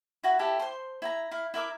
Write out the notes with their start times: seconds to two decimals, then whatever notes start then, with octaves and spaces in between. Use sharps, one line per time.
0.23 E4 F#4 F#5
0.39 E4 G4 A4 A5
0.59 C5 C6
1.02 E4 G#5 A#5
1.31 E4 F5
1.54 E4 A#4 E5 D6